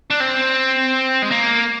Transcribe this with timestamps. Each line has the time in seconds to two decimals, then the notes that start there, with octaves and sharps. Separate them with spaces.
0.10 D4
0.20 C4
1.22 G#3
1.31 A#3